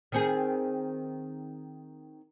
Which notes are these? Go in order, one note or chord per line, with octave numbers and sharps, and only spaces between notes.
D#3 C4 G#4